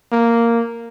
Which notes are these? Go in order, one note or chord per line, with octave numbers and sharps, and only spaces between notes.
A#3